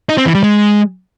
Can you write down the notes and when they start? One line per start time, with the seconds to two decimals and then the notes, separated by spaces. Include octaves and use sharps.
0.09 D#4
0.18 C4
0.26 E3
0.35 G3
0.43 G#3